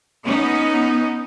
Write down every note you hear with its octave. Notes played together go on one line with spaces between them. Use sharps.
B3 C#4 D#4